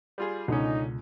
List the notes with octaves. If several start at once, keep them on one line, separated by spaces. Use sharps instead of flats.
G3 F4 G#4
C#2 B2 D3 C#4 D#4